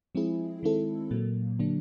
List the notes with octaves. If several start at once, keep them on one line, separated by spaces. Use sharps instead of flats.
F3 G#3 C4 E4 G#4
D#3 G#3 C4 E4 A4
A#2 F#3 A#3
D3 F#3 A#3 D4